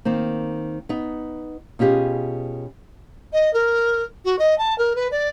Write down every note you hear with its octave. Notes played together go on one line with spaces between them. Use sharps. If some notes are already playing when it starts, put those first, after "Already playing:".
D#3 A#3 C4
B3 D#4
B2 C#4 F4 G4 G#4
D#5
A#4
F#4
D#5
A5
A#4
B4
D5